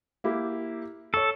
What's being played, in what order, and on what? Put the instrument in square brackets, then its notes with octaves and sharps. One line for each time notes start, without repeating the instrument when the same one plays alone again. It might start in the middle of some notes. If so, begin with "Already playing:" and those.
[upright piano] A#3 E4 G4
[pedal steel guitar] A4 [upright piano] C#5 C#6